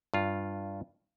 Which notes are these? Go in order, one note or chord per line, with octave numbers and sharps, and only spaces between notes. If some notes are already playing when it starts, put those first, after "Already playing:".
G2 F4